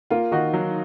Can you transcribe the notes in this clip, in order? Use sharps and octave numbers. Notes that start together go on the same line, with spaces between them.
A#3 F4
D#3 D#4 F#4
F#3